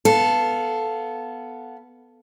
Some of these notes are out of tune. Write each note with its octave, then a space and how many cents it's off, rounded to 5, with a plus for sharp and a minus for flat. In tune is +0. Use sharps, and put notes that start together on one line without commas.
B3 +0 A4 +0 F5 -10